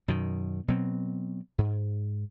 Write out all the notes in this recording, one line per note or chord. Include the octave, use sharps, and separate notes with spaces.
F#2 B2 D#3
B2 F#3 C4
G#2